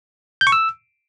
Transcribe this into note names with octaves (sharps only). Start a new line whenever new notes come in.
G6
C#6
E6